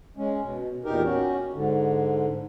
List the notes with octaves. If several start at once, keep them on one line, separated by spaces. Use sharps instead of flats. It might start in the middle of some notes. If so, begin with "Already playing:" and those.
G#3 C#4
B2
E2 A#2 D#4 G4 A#4
C#4 F#4
G#2 D3